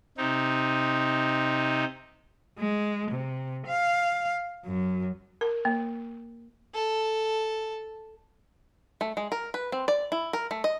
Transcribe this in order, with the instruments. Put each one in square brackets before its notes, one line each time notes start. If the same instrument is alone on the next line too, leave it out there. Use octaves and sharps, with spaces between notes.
[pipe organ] C3 D#4
[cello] G#3
C3
F5
F#2
[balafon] A#4
A#3
[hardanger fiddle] A4
[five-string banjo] A3
G#3
A#4
B4
C4
D5
E4
A#4
A3
D#5